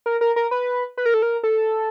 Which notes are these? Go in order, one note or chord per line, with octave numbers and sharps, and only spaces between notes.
A#4
A#4
A#4
B4
B4
A#4
A4
A#4
A4